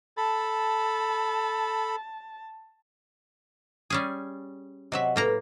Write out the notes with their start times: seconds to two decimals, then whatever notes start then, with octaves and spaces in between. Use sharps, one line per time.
0.17 A4 A5 B5
3.90 G3 C#4 G#4
4.92 C3 F#3 D#5 E5 F#5
5.16 A2 A#3 A4 B4 A#5